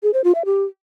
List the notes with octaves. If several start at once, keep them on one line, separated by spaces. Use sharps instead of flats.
G#4
C5
F4
E5
G4